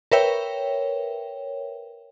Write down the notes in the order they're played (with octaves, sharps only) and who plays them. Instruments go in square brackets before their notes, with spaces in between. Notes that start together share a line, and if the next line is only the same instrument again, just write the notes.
[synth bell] A#4 B4 C#5 E5 G5